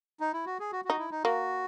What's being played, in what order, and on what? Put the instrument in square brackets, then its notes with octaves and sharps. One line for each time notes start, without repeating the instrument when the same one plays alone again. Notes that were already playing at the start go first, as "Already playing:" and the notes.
[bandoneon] D#4
E4
F#4
G#4
F#4
[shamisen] D#4 [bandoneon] F#4
[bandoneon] E4
D#4
[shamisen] A#3 [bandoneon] F#4